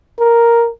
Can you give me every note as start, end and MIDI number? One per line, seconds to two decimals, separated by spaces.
0.19 0.69 70